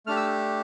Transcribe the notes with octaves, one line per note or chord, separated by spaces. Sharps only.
A3 D4 G4 F6
E6